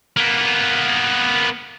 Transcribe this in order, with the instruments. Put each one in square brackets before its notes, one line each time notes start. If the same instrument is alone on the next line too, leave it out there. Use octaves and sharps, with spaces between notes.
[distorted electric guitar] A#3 B3